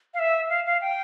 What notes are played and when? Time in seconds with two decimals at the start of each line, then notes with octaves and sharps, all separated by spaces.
0.14 F5
0.19 E5
0.50 F5
0.66 F5
0.81 G5